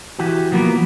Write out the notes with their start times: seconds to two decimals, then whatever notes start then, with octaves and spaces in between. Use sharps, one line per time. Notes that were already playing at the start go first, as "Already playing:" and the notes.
0.19 E3 F#4 G4
0.52 F3 F#3 A#3 B3